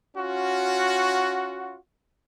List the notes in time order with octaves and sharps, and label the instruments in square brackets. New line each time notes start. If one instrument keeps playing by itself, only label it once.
[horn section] C#4 F4 F#4